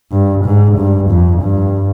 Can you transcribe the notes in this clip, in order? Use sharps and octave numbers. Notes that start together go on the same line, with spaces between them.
G2
G#2
G2
F2
G2